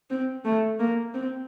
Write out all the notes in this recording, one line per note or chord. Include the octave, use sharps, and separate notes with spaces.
C4
A3
A#3
C4